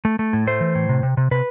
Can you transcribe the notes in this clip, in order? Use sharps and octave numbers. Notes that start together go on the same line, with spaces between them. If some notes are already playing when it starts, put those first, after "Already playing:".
A3
A3
A2
A3 C5
E3
A2
C3
C3
C3
C3 B4